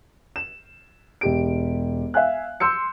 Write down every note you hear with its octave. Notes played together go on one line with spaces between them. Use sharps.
E7
E1 G4 D7
E5 F5 G#5 F#6
C6 E6 G6 C#7